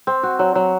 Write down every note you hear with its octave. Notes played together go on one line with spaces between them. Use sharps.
C4
F#4
F#3
F#3